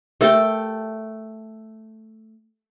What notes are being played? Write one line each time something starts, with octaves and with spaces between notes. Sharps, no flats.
A3 G4 A4 A#4 E5 G5